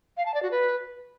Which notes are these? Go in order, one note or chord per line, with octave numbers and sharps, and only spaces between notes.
F5
A5
D5
F#4
B4